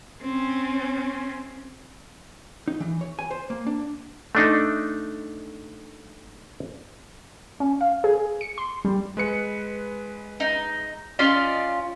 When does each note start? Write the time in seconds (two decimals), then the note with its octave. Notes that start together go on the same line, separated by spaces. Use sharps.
0.22 C4 C#4
2.68 D#4
2.80 E3
3.01 C#5
3.19 G#5
3.31 C5
3.50 A#3
3.67 D4
4.35 A3 D4 D#4
7.60 C#4
7.81 F5
8.04 G#4
8.41 C#7
8.58 C6
8.85 G3
9.17 G#3 B4 C#7
10.40 D#4
11.19 C#4 F4 D5 D#5 C6